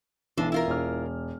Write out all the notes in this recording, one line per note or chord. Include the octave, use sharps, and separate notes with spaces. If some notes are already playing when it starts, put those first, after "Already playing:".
B1 E3 G#3 D4 A4
E4 F4 A#4
E1 F6